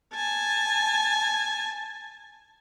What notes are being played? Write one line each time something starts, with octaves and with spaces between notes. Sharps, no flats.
G#5 A5